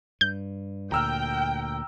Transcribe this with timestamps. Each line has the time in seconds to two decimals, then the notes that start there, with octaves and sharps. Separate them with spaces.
0.21 G2 G6
0.92 D2 A#2 G5 A#5 E6 F6